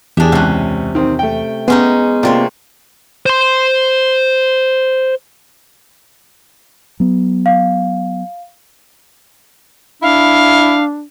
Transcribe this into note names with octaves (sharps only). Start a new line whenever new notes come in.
E2 D4 G4 G#4 E5
C#2 C3 C#4 F#6
D#3 C4
A3 G5
G#3 B3 C#4 D#4
C3 A#3 C4 F4 C#5 D5
C5 C6
F#3 B3
F5
D4 E4 F5